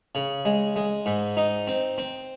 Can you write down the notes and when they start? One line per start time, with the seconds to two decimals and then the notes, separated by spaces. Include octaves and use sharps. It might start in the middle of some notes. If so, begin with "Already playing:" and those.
0.15 C#3
0.45 G#3
0.76 G#3
1.06 G#2
1.37 D#4
1.67 C4
1.98 C4